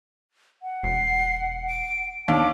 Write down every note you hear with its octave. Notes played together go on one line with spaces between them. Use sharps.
F#5
E1 C7
D7
D#2 D4 A5 D6